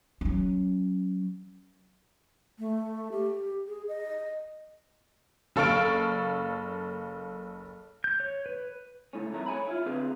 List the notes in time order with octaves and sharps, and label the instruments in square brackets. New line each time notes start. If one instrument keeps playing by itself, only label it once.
[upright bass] F#3 C#4
[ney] A3
G4
G#4
D#5
[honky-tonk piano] F#1 A4 F5 C#6 F6 D7
[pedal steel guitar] G6
C#5
B4
[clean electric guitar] C#2 A2 C#4
C2 F2 D#3 F#3 A3 A#5
C#5 G#5 B5
E4 F4
D3 C4 G#4 B4 F5